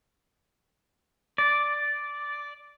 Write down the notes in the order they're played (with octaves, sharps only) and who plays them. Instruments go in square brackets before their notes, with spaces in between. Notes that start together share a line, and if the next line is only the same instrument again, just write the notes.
[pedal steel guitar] D5